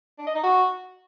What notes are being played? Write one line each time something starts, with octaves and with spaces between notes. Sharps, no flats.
D4
D#5
D#4
F#4